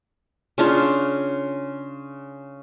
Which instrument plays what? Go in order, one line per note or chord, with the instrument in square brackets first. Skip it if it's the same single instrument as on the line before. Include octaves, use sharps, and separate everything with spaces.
[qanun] C#3 D4 F4 C#5